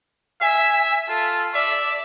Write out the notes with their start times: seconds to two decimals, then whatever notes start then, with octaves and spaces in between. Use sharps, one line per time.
0.41 E5 G#5
1.08 F4 A4
1.54 D5 E5